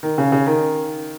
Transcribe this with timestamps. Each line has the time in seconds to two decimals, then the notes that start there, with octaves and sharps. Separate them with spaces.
0.03 D#3
0.18 C#3
0.32 C#3
0.46 D#3